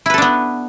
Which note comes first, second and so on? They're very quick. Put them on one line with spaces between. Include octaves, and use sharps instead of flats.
E4 B4 A4 D4 B3